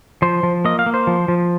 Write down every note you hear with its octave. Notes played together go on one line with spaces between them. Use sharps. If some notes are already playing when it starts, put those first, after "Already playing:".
F3 C5
F3
A#3 D#5
F5
A#3
C5
F3
F3